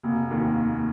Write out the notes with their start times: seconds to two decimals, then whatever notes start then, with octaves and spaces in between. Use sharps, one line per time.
0.03 F1 A#3
0.30 D#2 D#3